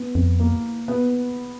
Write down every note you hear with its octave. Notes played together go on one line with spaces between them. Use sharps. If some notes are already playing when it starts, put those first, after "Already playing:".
Already playing: B3
F2
A#3
B3